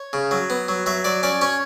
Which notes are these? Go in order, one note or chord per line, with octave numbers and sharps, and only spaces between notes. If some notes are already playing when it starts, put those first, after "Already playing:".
Already playing: C#5
C#3
F#3
B3
F#3
F#3 E5
F#3 D5
C#4 D5
C#4 C#5